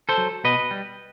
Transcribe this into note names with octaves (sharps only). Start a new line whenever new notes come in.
A4 C5
F#3
B2 B4 D#5
G3